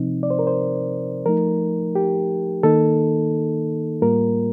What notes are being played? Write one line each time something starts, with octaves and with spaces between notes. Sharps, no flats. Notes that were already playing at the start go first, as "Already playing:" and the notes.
Already playing: C3 F3 C4 D#4
D5
C5
A#4
C5
F3 A3 D#4 A#4
G4
D#3 A#3 D#4 A4
A2 G3 A#3 F4 A#4